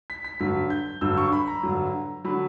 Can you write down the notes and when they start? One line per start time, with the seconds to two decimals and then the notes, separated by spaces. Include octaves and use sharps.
0.10 B6
0.24 B6
0.40 G2 D3 F#3 B6
0.70 G6
1.01 G2 D3 F#3 E6
1.17 C#6
1.32 B5
1.47 A#5
1.63 G2 D3 F#3
2.24 D3 F#3 B5